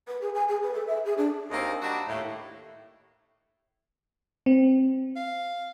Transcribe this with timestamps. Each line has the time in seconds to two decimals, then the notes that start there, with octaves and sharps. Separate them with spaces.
0.08 B4
0.21 G#4
0.35 G#5
0.48 G#4
0.62 B4
0.74 A4
0.87 E5
1.05 G#4
1.18 D4
1.50 D#2 A#3 C4 D#4
1.82 G3 D4 D#4 F#4
2.08 D#2 A2
4.46 C4
5.16 F5